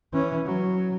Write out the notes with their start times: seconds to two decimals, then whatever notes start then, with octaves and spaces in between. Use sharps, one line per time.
0.13 E3 C#4
0.46 F#3